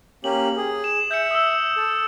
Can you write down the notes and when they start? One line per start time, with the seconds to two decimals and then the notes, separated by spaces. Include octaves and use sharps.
0.24 A#3 C#4 G4 F#7
0.57 G#4
0.84 E7
1.11 E5 G6 C#7
1.31 D#6 E6
1.76 A4